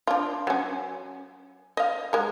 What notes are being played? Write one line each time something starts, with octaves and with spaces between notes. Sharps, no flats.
D4 F4
F#3 C#4
D#5 F5
G#3 A#4